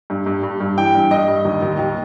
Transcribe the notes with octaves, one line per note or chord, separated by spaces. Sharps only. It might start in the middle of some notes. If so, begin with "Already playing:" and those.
G2
G2
G2
G2
E3 G5
G2
G2 D#5
G2
D#2
D#2
D#2